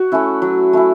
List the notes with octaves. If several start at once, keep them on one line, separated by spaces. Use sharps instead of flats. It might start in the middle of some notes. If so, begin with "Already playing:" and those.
Already playing: F#4
A3 C#4 E4
F#3
A3 C#4 E4